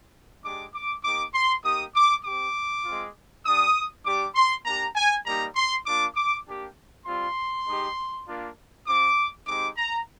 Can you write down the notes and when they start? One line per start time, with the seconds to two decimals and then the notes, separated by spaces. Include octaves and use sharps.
0.43 G#3 D4 G4 D6
0.74 D6
1.04 A#3 D#4 G4 D6
1.34 C6
1.64 A#3 D#4 G4 D#6
1.95 D6
2.25 C4 G4 D6
2.85 G#3 C4 F4
3.44 G3 D4 G4 D#6
4.05 G3 D4 G4 D6
4.35 C6
4.65 A#3 D4 G4 A#5
4.95 G#5
5.25 G3 A#3 D#4 G4 A#5
5.56 C6
5.86 A#3 D4 F4 D6
6.16 D6
6.46 A#3 D4 G4
7.06 G3 C4 F4 C6
7.66 G#3 D#4 G4
8.26 A#3 D4 F4
8.87 C4 F4 D6
9.47 G#3 C4 D#4 G4 D6
9.77 A#5